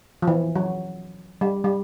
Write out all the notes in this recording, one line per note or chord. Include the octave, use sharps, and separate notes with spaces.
F3
E3
F#3
G3
G3